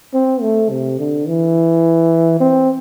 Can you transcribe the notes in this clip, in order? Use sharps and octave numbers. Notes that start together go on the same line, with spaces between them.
C4
A3
C3
D3
E3
C4